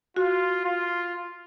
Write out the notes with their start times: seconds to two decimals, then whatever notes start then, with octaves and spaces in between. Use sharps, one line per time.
0.16 F4 F#4
0.64 F4